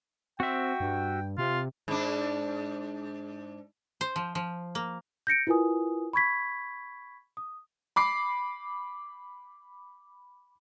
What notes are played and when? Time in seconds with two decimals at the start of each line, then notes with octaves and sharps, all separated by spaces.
0.40 C4 F#4 E5 G5
0.80 G2
1.38 C3 F4
1.88 G#2 D4
4.01 C5
4.16 F3
4.35 F3
4.75 A#3
5.27 G6 A#6 C#7 D7
5.47 E4 F4 A#4 B4 G#5 D#6
6.13 B5 C#6 G#6 B6
7.37 D#6
7.96 B5 D6 C7